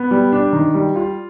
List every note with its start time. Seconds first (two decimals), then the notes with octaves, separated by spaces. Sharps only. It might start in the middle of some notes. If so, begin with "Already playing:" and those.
Already playing: B3
0.11 G3
0.32 D4
0.53 D#3
0.74 G3
0.96 F4